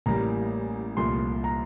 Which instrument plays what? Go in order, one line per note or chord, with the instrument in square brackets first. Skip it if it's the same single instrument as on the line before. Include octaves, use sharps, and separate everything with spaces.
[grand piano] A1 A2 G3 A#3 A#5
C2 A#2 F3 A3 C6
A#5